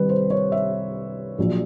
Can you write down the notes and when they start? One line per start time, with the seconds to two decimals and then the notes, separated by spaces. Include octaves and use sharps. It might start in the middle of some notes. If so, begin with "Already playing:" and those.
Already playing: C2 C3 D#3 G3 B4
0.09 C5
0.30 C#5
0.52 E5
1.38 A#1 A#2 F#3